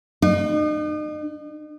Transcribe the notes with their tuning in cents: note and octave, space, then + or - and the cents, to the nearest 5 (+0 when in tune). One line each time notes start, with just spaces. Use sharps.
D#4 -40